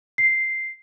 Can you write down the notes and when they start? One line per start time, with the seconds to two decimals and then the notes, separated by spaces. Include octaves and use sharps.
0.18 C7